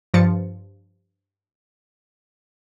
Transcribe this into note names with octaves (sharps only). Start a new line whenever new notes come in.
G2 F3 A6 C#7